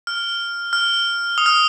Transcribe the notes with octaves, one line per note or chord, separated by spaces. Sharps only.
F6
F6
D#6
F6